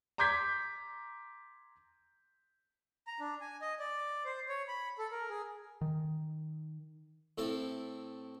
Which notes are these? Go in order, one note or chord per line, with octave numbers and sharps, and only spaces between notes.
A#5 C6 D6 G6 G#6 B6
A#5
D4
G#5
D#5
D5
C5
C#5
B5
A4
A#4
G#4
D#3
A2 C4 E4 A4